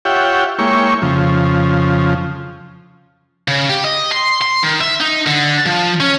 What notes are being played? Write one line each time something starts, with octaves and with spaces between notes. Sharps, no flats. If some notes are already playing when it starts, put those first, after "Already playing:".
F4 G4 C#5 E5 F#5 G5
G#3 A#3 E4 C#5 G5 C#6
F2 C#3 F3
C#3
G4
D#5
C6
C6
D#3
E5
D#4
D3
F3
C#4